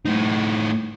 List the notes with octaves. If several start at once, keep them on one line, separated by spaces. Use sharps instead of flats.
A2 D#4